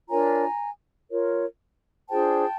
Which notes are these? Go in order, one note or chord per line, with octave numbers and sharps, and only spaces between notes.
D4 F4 A#4 C#5 G#5 A#5
F4 A#4 C#5
D4 F4 G#4 C5 G5 A5